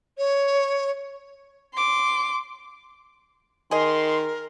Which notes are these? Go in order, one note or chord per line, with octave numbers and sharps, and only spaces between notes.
C#5
C6 D6
D#3 G#4 A#4 D#5 C6